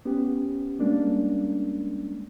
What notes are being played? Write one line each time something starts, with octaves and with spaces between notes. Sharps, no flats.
B3 C#4 G4
G3 G#3 A#3 C#4 D4